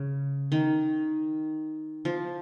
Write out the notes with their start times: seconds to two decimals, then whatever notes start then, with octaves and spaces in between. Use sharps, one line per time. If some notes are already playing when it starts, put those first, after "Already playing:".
Already playing: C#3
0.52 D#3
2.05 F3